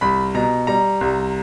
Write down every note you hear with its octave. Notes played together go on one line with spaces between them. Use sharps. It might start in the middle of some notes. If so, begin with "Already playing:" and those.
C2 B5
B2 A#5
G3 A#5
C2